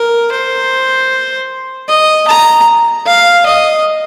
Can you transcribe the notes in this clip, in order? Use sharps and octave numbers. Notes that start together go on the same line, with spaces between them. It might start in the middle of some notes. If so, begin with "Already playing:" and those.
Already playing: A#4
C5
D#5
A#5
F5
D#5